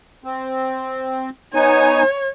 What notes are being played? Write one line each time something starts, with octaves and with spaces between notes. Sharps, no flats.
C4
B3 D#4 C#5 G#5